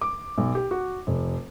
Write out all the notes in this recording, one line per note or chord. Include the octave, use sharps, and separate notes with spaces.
D6
B1
G4
F#4
F1